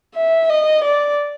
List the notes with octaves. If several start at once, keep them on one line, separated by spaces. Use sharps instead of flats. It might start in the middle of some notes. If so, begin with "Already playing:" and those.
E5
D#5
D5